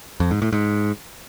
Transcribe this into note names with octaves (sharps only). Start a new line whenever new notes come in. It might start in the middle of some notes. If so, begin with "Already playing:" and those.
F2
G#2
A2
G#2